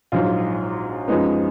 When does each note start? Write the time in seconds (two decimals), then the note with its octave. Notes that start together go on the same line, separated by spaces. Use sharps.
0.12 A#1 G#2 F#3 F4
1.08 F#2 F3 G#3 B3 D#4